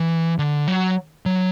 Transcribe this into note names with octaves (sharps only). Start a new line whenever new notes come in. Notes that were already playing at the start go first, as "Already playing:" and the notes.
Already playing: E3
D3
F#3
F#3